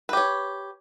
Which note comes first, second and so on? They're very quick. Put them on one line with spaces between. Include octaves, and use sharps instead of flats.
B4 G4 C#5